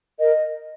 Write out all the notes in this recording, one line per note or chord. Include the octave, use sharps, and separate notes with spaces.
A#4 D#5